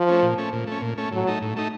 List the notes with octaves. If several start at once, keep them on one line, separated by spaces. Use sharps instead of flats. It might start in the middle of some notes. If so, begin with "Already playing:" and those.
Already playing: F3
A3 C#4
A#2
A3 C#4
A#2
A3 C#4
A#2
A3 C#4
A2 F#3
A3 D#4
A2
A3 D#4